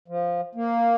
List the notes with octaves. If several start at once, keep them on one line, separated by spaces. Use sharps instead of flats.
F3
A#3